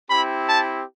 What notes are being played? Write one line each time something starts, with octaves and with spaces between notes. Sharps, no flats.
C4 E4 G4 B5
A5